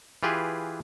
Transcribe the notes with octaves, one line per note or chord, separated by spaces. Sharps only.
E3 F4 G4 G#4 B4